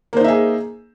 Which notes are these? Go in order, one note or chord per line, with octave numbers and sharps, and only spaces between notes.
A#3 D#4 G#4 C5 E5